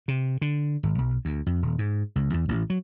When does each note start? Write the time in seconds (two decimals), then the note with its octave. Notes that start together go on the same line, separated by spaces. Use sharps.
0.08 C3
0.41 D3
0.83 G#1
0.98 B1
1.25 D2
1.46 F2
1.62 D#1
1.79 G#2
2.16 C#2
2.33 E2
2.49 A1
2.70 F#3